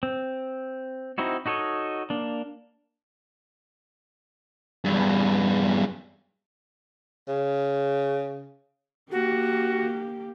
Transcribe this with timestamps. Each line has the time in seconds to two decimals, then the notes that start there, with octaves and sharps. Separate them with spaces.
0.03 C4
1.18 C4 D#4 E4 F#4
1.46 D#4 F#4 A4 C#5 D#5
2.10 A#3 D4
4.85 E2 G2
7.28 C#3
9.12 A#3 F#4 G4